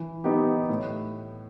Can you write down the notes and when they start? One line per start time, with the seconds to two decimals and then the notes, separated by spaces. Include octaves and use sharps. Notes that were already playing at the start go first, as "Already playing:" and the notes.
Already playing: E3
0.24 B3 D#4 G4
0.69 A2